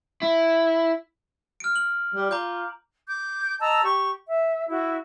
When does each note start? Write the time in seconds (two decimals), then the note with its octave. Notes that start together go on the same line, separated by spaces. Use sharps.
0.22 E4
1.60 F6 D7
1.76 F#7
2.15 G3
2.31 F4 A#5 D6 G6
3.08 D6 G6
3.60 D#5 A5 A#5 E6
3.83 G4 C#6
4.26 E5
4.68 E4 F#4